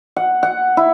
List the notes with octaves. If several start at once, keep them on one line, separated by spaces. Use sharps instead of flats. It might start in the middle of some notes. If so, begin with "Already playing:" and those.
F#5
F#5
E4